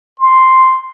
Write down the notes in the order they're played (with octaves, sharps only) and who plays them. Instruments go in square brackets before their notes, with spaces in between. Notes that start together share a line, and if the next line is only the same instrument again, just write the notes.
[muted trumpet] C6